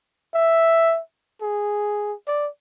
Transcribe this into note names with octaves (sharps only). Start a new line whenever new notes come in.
E5
G#4
D5